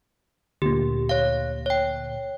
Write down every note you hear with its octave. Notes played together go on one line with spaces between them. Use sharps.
D2 A#2 G4
C#5 F5
C#5 G5